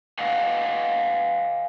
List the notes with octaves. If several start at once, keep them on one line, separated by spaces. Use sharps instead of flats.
B4 D#5 F5 F#5 G#5